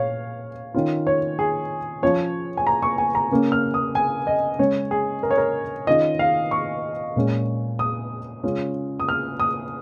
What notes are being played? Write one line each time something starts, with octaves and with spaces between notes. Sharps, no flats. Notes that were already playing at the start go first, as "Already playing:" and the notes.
Already playing: A#2 C#5 F5
D#3 C#4 F4
C#5
G#4
F3 C#4 F4 C#5
G#5
A#5
C#6
G#5
A#5
C#3 A#3 C#4
F6
D#6
G#5
D#5
C#3 G#3 C#4 C#5
G#4
A#4
C#5
A#4
D#3 C#4 F4 D#5
F5
C#6
A#2 G#3 C#4
D#6
C#3 G#3 C#4 F4
D#6
F6
D#6